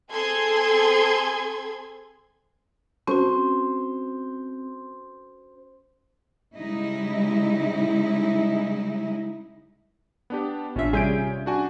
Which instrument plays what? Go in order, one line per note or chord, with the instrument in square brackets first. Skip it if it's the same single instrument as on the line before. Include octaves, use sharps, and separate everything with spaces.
[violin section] C4 G#4 A4 C6 G#6
[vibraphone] C4 [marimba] C#4 F#4 [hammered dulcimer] C5
[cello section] C#3 G3 G#3 D#4 E4
[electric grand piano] B3 D4 G4
[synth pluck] A1 E5 [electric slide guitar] A#2 D4 [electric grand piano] C#4 F4
[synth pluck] C3 G3 E5 [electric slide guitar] C#4 [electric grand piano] F4 G6 D7 [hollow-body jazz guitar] G#4
[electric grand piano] D4 F#4 G#5